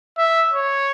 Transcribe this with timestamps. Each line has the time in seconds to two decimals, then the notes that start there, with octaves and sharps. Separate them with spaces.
0.18 E5
0.54 C#5